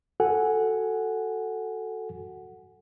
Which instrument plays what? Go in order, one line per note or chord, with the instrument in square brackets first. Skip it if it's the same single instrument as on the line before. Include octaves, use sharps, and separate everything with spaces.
[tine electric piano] F#4 A4 F#5 G#5